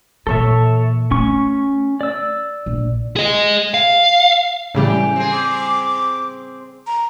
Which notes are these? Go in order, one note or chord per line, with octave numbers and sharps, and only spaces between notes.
A#2 E3 A4 C#5 E5
A3 C#4 C#6
D5 E6
A#1
G#4 D#5
F5
F#2 A2 C#3 E3 G3 G4
C4 G#4
D6
A#5